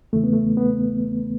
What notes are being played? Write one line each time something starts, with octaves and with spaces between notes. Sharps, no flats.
E2 C#3 E3 A3
B3
A3
B3